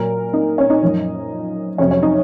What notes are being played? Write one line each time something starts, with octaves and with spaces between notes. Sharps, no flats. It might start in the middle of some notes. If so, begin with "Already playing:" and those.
Already playing: A#2 F#3 A#4
D#4
C#4
D#4
F#2 F3
F2 C3 F#3 C#4
C#4
D#4